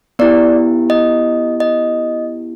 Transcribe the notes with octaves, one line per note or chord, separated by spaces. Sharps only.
B3 E4 G4 D5
D#5
D#5